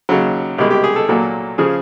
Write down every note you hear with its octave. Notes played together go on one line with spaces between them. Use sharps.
D#2 C#3 F#3
C2 B2 G#3 G4
G4
G#4
A4
A#2 F#3 A#3 A4
C#3 F3 G#4